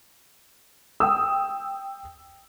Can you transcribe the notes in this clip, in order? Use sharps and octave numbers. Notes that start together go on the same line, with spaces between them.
G5 D#6 E6